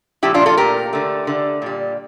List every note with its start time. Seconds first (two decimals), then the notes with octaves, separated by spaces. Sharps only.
0.23 A#2 F3 A3 E4 G4
0.34 D4 F4
0.46 F4 A4
0.57 A#2 F3 A3 G4 A#4
0.93 D3 A3
1.27 D3 A3
1.62 A#2 G3